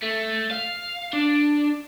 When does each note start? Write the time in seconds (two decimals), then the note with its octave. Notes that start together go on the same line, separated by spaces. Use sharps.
0.03 A3
0.51 F5
1.13 D4